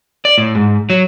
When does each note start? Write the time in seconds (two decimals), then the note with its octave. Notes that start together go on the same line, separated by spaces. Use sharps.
0.25 D5
0.38 A2
0.55 G#2
0.90 F#3